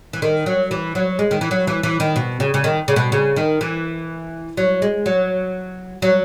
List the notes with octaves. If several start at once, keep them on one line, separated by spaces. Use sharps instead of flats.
E3
D#3
F#3
E3
F#3
G#3
D#3
E3
F#3
E3
E3
D#3
B2
C#3
C#3
D#3
C#3
B2
C#3
D#3
E3
F#3
G#3
F#3
F#3